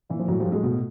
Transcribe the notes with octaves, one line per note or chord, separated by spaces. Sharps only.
A#2 E3
F3
A2 E3 F#3
F3 G3
A2
F#3 G#3
B2